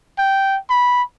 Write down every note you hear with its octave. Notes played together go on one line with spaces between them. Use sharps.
G5
B5